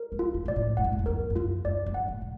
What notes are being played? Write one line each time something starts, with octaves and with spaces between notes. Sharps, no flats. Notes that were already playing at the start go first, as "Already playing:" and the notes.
Already playing: A#4
D#3
F4
D3
A#2 D5
A2
G2 F#5
G#2
G2
F#2
F2 A#4
G2
F#2 F4
F#2 D5
G2
F#5
A2
A2